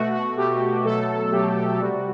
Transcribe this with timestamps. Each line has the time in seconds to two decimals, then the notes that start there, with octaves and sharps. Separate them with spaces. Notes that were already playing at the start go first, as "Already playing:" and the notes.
Already playing: B2 A3 F#4
0.13 F#4
0.37 B2 A3 G4
0.85 B2 F#3 A3 A4
1.32 B2 F#3 A3 G4
1.56 G4
1.79 C3 G3 F#4